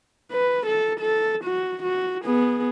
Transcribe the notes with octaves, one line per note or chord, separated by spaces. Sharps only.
B4
A4
A4
F#4
F#4
B3 G#4